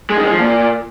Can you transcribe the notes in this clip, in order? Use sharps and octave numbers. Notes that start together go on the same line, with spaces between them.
G#3
D#3
G#3
F3
A#2